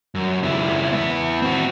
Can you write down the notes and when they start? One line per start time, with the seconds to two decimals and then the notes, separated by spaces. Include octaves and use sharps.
0.15 F#2
0.43 C#2 E4
0.92 B3 E4
1.42 C4 F#4